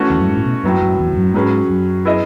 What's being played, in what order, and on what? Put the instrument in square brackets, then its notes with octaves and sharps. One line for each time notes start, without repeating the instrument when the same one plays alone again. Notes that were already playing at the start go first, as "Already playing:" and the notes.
Already playing: [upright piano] E3 A3 C#4 F#4
[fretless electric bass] E2
F#2
G#2
A2
B2
[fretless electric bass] F#2 [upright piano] A2 F#3 B3
[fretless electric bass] F#2
E2
E2
F#2
[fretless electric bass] G#2 [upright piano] F#3 C#4 G#4 B4
[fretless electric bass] F#2
[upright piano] B3 E4 G#4 D#5